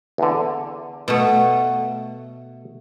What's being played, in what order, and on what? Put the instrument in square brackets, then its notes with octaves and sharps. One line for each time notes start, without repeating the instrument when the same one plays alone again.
[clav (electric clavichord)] E2 D3
[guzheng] B2 A3